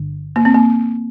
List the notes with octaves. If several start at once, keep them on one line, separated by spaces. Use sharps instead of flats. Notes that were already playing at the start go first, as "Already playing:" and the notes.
Already playing: G1 G2 D3
A#3
C4
A#3